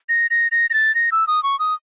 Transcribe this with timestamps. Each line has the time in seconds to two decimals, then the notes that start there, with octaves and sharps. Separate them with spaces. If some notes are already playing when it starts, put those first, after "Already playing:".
0.09 A#6
0.31 A#6
0.52 A#6
0.70 A#6
0.74 A6
0.95 A#6
1.12 E6
1.27 D#6
1.43 C#6
1.59 D#6